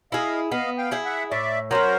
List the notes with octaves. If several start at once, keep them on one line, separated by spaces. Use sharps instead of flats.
E4 G#4 D#5 F5
B3 D#5 F5
F5 G5
E4 G#4
E5 F#5
A2 D5 E5
F#3 A#3 C#4 A#4 C5